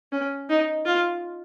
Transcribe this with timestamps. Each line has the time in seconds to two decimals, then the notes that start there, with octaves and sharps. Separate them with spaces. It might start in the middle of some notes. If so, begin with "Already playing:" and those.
0.12 C#4
0.49 D#4
0.86 F4